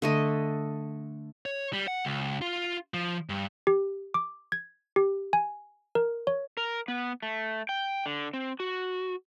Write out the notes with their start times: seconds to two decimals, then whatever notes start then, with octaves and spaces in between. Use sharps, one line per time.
0.02 D3 A3 D#5
1.46 C#5
1.73 G3
1.88 F#5
2.05 C#2
2.42 F4
2.94 F3
3.29 G2
3.67 G4
4.14 D6
4.52 G#6
4.96 G4
5.33 G#5
5.95 A#4
6.27 C#5
6.57 A#4
6.88 B3
7.23 A3
7.69 G5
8.06 D3
8.34 C4
8.60 F#4